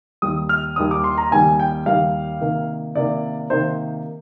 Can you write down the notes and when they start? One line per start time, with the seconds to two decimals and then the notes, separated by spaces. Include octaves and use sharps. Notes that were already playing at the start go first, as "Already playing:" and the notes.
0.22 D#2 D#3 G3 D#6
0.49 F6
0.76 D#2 D#3 G3 D#6
0.91 D6
1.04 C6
1.18 A#5
1.31 D#2 D#3 G3 G#5
1.60 G5
1.86 D#2 D#3 G3 F5
2.41 C3 D#3 A#3
2.95 C3 D#3 A#3 D5
3.50 C3 D#3 A#3 C5